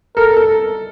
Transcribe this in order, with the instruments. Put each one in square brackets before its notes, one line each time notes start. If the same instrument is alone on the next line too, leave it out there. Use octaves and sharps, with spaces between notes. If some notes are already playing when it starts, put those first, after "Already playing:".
[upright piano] A4 [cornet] A#4
[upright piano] A4